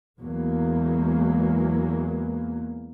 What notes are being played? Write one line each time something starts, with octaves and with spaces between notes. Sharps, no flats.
E2 F#3 G#3 A#3